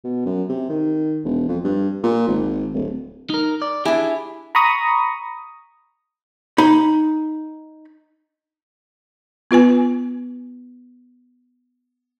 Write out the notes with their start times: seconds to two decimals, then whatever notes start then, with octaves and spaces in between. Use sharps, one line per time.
0.04 B2
0.26 F#2
0.49 C3
0.69 D#3
1.24 E1
1.48 F2
1.64 G2
2.03 A#2
2.28 G#1
2.74 D1
3.30 D#4 A#4
3.62 D5
3.85 D4 E4 G4 G#4 G#5
4.55 A#5 B5 C#6 D#6
6.58 D#4 B5
9.51 B3 F4 B4 G#5